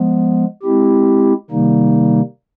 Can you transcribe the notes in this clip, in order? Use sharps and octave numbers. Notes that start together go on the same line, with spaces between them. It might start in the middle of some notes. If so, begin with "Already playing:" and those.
Already playing: F3 G#3 B3
G#3 C4 E4 G4
C3 D#3 G3 A#3 D#4